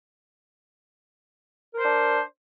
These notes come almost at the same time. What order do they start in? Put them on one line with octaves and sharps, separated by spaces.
A#4 C5 D4